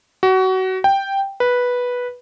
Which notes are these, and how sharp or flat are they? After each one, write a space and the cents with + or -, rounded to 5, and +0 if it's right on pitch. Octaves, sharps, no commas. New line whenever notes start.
F#4 +25
G5 +0
B4 -10